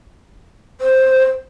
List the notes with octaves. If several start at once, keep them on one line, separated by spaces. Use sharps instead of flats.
C5